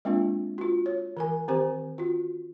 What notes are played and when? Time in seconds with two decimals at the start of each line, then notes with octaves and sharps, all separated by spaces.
0.05 G#3 A#3 C4 D4 F4
0.58 F4 F#4
0.86 C#5
1.17 E3 A#4 G#5
1.48 D#3 C4 G4 C5 G#5
1.98 F4 F#4